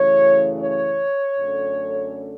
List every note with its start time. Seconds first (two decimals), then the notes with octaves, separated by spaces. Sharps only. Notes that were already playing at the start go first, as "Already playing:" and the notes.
Already playing: F#2 C#3 E3 A3 C#5
0.60 C#5
1.39 F#2 D3 A3 C#4